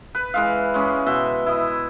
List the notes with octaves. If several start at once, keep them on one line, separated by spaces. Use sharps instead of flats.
B4
E3 G#3 F5
G#3 C#4
B2 E5 C6
E4 D#5